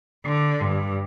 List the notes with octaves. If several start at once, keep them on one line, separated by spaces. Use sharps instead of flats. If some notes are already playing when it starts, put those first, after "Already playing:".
D3
G2